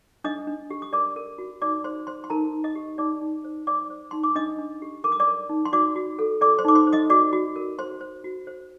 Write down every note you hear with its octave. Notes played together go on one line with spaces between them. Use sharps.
D4 D#5 D#6
D4
G4
D#6
A#4 D5 D6
A#4
F#4
D#4 D5 D6
C5 C6
C5 C6
C6
D#4 A#4 A#5
A#4
D#5 D#6
G4
D#4 D5 D6
D#4
C5
C5 D5 D6
C5
D#4 C6
D6
D4 D#5 D#6
D4
G4
A#4 D6
D#6
D5 D6
A#4
D#4
C6
F#4 D5 D6
F#4
A4
A4 D5 D6
C5 C6
D#4 D6
C5 C6
C5
D#5 D#6
F#4 D5 D6
F#4
A#4
C5 C6
C5
F#4
C5